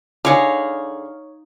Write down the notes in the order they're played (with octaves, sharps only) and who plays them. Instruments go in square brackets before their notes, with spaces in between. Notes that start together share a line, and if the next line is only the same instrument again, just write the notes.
[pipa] D3 G#4 [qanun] D#4 C#5 F5